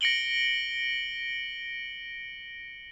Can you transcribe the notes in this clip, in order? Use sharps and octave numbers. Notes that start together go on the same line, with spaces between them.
A#6 C#7 D7 F#7 G7